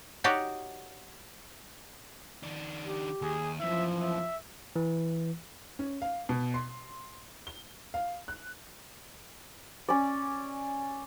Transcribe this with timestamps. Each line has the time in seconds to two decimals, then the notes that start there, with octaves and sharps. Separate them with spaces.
0.24 D#4 F#4 G4 C#5 D5
2.43 D#3 D4
2.84 G4
3.22 D#2 G#4
3.60 F#2 E3 F3 E5
4.01 E5
4.76 E3
5.79 C#4
6.02 F5
6.29 B2
6.54 C6
7.47 G7
7.94 F5
8.28 F#6
9.89 C#4 D5